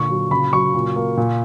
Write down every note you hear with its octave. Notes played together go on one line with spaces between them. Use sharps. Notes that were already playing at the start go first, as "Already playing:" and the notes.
Already playing: A#2 D3 C#6
F#3
C#3 B5
F#3 C#6
A#2
A#3
A#2